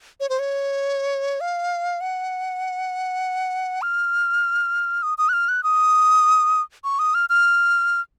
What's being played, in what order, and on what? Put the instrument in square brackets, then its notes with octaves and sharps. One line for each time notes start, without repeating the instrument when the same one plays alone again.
[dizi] C#5
C5
C#5
F5
F#5
F6
D#6
D#6
F#6
F6
F#6
D#6
C#6
D#6
F6
F6